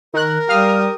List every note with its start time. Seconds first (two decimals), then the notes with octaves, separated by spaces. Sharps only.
0.14 D#3 A#4 F#6
0.49 G3 G4 F5 D#6 F6